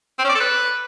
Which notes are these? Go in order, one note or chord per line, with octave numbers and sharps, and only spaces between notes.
C4
C#4
D5
A4
B4